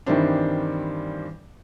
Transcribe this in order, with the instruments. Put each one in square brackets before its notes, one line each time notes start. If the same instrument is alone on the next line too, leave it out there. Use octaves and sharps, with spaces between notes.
[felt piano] G2 D#3 E3 G3 C4 D4